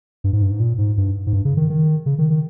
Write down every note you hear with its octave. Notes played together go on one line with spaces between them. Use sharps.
G2
G#2
G2
G#2
A#2
G#2
G2
G#2
G2
C#3
D#3
D#3
C#3
D#3
D#3